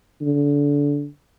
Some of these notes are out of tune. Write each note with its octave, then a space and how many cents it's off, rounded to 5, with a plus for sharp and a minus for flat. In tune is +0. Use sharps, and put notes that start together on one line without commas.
D3 -25